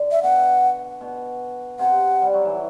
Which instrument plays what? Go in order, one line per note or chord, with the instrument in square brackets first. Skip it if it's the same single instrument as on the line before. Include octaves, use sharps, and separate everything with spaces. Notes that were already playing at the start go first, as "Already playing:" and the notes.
Already playing: [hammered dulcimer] D3
[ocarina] E5
[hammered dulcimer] B2 [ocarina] F#5
[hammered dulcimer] B2
[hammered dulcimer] C3 [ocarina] F#5
[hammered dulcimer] G3
F#3
E3